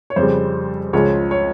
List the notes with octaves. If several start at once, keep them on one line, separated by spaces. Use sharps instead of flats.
C#5
F2 C#3 G3 C5
C#2 C#3 F3 G#3 C#5
C#5